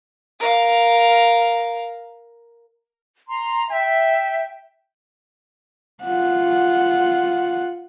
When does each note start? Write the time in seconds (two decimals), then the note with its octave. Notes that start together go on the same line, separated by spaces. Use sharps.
0.40 A#4 F5
3.29 A#5 C6
3.71 E5 G5
6.04 F4 F#5